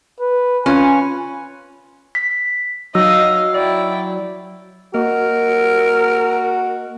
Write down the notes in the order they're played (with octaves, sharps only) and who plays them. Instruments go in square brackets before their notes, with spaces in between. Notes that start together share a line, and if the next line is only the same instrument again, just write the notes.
[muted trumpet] B4
[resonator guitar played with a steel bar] C#4 [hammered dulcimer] F4 B4 [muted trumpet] G#5
[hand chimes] B6
[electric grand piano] F#3 [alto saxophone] D#4 [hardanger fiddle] D#5 F5 [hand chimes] E6
[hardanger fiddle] E4 G5 [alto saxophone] D5
[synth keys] A#3 D#5 [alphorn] F#4 [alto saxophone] A#4